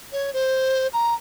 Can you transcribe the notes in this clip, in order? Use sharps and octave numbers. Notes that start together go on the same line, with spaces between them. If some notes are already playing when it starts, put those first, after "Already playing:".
C#5
C5
A#5